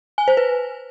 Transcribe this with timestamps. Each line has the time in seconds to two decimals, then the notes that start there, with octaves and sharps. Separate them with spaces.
0.18 G#5
0.28 C5
0.37 B4